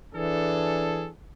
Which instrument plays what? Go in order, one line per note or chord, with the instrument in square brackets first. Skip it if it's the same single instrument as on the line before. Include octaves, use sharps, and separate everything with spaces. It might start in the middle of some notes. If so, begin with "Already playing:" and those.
[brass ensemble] E3 D4 G#4 A4